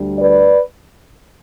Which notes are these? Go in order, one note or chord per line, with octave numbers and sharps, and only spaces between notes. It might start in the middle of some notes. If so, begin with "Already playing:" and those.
Already playing: D2 D3 G3
B4 D5